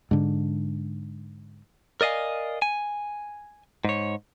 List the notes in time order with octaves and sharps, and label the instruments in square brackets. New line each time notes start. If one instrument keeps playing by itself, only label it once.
[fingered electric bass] G#2 D3
[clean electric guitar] A#4 D5 D#5 F5 G#5
G#5
G#2 C#5